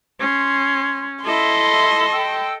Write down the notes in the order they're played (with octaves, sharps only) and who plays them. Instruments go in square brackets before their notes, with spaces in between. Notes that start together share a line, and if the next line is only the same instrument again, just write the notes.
[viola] C#4 [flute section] C6
[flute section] E4 [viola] A4 D#5 [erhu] C6
[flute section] G5 E6